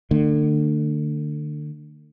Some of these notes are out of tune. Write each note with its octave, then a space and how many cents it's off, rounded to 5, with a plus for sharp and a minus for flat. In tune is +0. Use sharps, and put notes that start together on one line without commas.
D3 +30 A3 +40